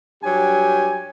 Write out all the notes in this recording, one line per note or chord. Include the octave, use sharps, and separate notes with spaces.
G2 F#3 G4 G#5